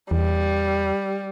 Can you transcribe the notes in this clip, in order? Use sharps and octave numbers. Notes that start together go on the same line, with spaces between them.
E2 G3